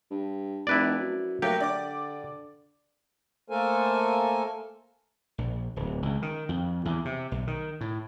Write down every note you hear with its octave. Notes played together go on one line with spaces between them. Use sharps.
G2
F1 E4 B4 D5
F#2
F#3 A3 A#3 G4
D3 D5 D6
A3 A#3 A4 A#4 C5 G#5
A#1
D1
C#2
D#3
F2
E2
C3
B1
D#3
A2